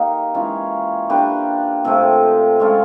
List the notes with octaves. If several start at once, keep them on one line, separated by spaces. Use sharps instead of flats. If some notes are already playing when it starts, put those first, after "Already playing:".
Already playing: A#3 D#4 G4
E3 G#3 C#4 F4
A#3 D4 G4 B4
C3 F3 A3 C4
G#3 C#4 F4 A4